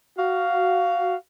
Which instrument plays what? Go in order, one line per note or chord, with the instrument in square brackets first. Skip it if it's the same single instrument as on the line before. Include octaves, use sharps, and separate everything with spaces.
[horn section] F#4 F5